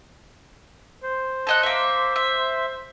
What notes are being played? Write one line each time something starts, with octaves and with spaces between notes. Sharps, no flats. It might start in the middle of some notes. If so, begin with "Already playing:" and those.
C5
A4 D#5 F#6
A#3 E5
E5